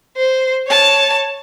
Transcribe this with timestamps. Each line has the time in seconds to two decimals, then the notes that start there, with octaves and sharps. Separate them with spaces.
0.16 C5
0.67 C#5 A5